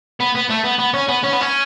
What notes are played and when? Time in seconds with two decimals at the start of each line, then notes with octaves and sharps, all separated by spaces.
0.21 B3
0.36 B3
0.50 A3
0.65 B3
0.79 B3
0.94 C#4
1.08 B3
1.23 C#4
1.32 B3
1.40 C#4